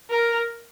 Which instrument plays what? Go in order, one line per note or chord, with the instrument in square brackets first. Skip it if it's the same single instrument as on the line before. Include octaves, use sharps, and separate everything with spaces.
[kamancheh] A#4